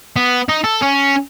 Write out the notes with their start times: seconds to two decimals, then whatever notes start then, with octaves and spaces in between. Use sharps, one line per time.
0.16 B3
0.49 D#4
0.64 A4
0.82 C#4